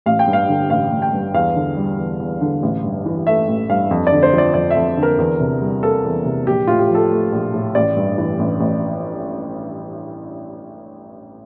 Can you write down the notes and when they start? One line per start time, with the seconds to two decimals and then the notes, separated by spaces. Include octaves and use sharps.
0.06 A1 F5
0.19 G5
0.27 G2
0.33 F5
0.49 D3
0.70 A1 F5
0.92 A1
1.02 G5
1.13 G2
1.34 E2 F5
1.55 D3
1.77 G3
1.98 E2
2.20 E2
2.41 D3
2.62 A1
2.84 G2
3.06 E3
3.27 A3 E5
3.48 A1
3.69 G2 F5
3.91 F2
4.07 D5
4.12 D3
4.23 C5
4.33 F3
4.38 D5
4.54 F2 D5
4.70 E5
4.76 F2
4.97 D3
5.03 A#4
5.19 E2
5.40 C3
5.61 G3
5.83 A#3 A4
6.04 E2
6.25 C3
6.47 A#1 G4
6.67 A2 F4
6.79 G4
6.90 F3
6.95 A4
7.11 A3
7.32 A#1
7.54 A2
7.75 A1 D5
7.96 G2
8.18 E3
8.39 A1
8.60 A1